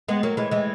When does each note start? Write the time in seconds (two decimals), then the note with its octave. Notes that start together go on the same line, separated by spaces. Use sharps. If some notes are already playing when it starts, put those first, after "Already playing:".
0.08 G#3 B3
0.23 F#3 A#3
0.37 E3 G#3
0.51 E3 G#3